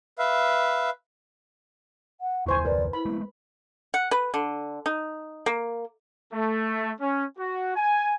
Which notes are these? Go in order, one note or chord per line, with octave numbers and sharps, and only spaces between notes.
B4 E5 F5
F#5
F#1 D#2 E4 C5 G#5 C#6
A#4 B4 D5
E4 B5
G#3 A3 B3
F#5
B4
D3
D#4
A#3
A3
C#4
F#4
G#5